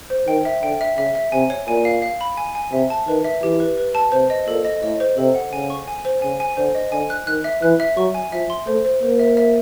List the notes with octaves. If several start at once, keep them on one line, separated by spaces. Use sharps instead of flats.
C5
D#3 G5
E5
D3 G5
E5
C#3 E5
E5
C3 G#5
C#5
A#2 G#5
F5
F5
B5
G#5
G#5
C3 E5
A5
D#3 B4
E5
E3 G4
B4
B4
A5
C3 C5
D#5
A#2 A4
D#5
A2 D#5
C5
C3 A4
F#5
C#3 G#5
C#6
G#5
C5
C#3 G#5
G#5
D3 C5
D#5
D3 G#5
F#6
D#3 F#6
E5
E3 F#6
E5
F#3 C#6
G#5
F3 E5
C6
A3 C5
C5
A#3 C5
E5
E5